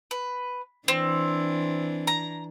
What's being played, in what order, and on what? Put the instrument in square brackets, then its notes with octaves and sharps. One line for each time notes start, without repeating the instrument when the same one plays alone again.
[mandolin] B4
[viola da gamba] E3 D4 [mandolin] C4
[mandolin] A#5